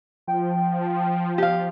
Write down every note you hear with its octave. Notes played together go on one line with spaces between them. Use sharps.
F3 G5
G4 F5